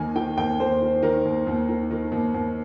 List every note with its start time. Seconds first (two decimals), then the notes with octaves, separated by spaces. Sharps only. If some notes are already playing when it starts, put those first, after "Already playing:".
Already playing: D#2 D#3 G#5
0.16 D#3 G5
0.37 D#2 G5
0.59 D#2 C5
0.82 D#3
1.03 D#3 A#4
1.25 D#2
1.47 D#2
1.69 D#3
1.91 D#3
2.12 D#2
2.34 D#2